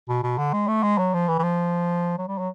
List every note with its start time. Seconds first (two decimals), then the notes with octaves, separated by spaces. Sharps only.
0.08 B2
0.23 B2
0.38 D3
0.53 G#3
0.68 A3
0.83 G#3
0.98 F#3
1.14 F3
1.28 E3
1.39 E3
1.43 F3
2.18 F#3
2.28 G3
2.38 F#3